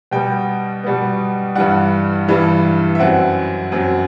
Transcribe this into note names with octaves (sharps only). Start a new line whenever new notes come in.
B2 G3 B3 G5
B2 G3 B3
G2 E3 G3 F#5
G2 E3 G3
E5
F#2 F#3 C4 F#5
F#2 F#3 C4